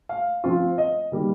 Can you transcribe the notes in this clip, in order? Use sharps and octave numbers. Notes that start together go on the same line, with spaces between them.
F5
F3 C4 F4
D#5
D#3 G3 A#3